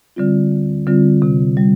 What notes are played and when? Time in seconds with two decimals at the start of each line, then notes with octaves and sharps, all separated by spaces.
0.16 D3 G3 C4 F4
0.52 D2
0.87 D3 G3 C4 F4
1.22 C3
1.57 G3